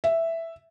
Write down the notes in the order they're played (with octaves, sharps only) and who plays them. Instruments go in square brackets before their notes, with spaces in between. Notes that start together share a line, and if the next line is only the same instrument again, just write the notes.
[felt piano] E5